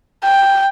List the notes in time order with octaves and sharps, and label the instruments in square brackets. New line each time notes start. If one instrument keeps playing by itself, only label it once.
[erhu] G5